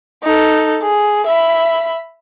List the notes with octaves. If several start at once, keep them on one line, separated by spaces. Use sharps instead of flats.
D#4 A4
G#4
E5 B5